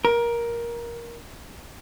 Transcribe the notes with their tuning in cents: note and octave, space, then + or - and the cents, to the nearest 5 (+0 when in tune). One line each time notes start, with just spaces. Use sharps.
A#4 +15